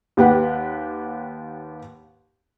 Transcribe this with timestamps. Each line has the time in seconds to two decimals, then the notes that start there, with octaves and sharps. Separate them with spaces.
0.17 D#2 G4 B4 F#5